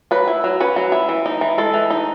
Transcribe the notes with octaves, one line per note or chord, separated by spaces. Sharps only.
F#3 B4
E4
F#3
C#4 B4
F#3
E4
E3
D#4
E3
G#3 A4
E3
D#4